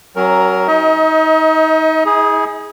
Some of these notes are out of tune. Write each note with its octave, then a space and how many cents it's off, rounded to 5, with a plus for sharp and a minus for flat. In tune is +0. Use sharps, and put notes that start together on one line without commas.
F#3 +20 C#4 -20 A#4 +0
D#4 +25 D#5 +45
E4 -45 G#4 +0